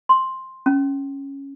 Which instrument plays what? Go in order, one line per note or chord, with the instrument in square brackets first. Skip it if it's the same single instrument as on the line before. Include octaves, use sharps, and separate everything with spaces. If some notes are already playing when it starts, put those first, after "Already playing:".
[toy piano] C6
C#4